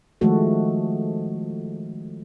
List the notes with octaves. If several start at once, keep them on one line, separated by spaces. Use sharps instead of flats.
D#3 F3 G#3 A3 F#4 A4